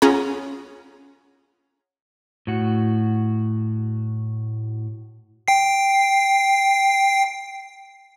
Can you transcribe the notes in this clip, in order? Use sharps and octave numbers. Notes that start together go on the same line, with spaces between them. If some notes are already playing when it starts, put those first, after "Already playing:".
C#4 F4 G#4 F#5 A#5
A2 F#4
G5 C7